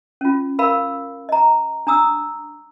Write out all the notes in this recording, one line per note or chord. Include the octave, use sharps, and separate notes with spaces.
C#4 F4
A#4 F5 B5 E6
D#5 A#5
D4 A#5 D#6 E6